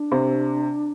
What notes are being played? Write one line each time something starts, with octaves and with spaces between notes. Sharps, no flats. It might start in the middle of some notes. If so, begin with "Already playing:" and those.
Already playing: D4
C3